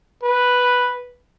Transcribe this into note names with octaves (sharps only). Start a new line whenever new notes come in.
B4